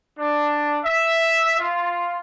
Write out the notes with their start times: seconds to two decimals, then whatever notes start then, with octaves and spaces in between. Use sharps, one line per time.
0.19 D4
0.85 E5
1.58 F4